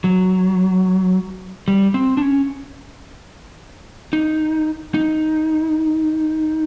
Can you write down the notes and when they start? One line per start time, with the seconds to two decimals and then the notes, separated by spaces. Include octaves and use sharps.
0.04 F#3
1.68 G3
1.94 C4
2.17 D4
2.22 C#4
4.13 D#4
4.94 D#4